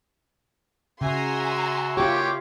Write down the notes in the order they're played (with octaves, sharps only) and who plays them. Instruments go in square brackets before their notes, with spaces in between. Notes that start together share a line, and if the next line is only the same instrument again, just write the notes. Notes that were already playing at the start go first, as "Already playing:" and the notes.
[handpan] C#3 [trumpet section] F#4 E5 [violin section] G#5 A#5 C6
[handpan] F4 G4 [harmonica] C#5 G5 D6